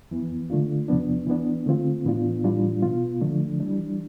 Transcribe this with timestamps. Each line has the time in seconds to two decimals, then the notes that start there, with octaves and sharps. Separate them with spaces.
0.11 F2 E3 B3
0.50 D3 A3 D4 F4
0.88 E2 C3 F3 B3 D4
1.27 E3 B3 D4
1.66 D3 A3 C4 F4
2.05 A2 E3 B3 D4 F4
2.44 A2 E3 G3 D4 F4
2.82 B2 B3 F4
3.21 D3 F3 A3 D4
3.60 E3 G3 D4